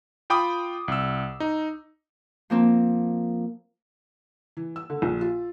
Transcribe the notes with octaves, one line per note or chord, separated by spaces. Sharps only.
F4 G5 B5 D6 D#6
C2 E6
D#4
F3 A#3 C4
E3
E6
D3
A#1
F4